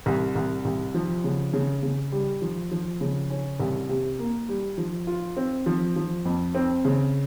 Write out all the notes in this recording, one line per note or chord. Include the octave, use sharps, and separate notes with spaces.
C2
C2
C2
F3
C#3
C#3
C#3
G3
F3
F3
C#3
C#4
C2
C3
A#3
G3
F3
F4
C4
F3
F3
F2
C4
C#3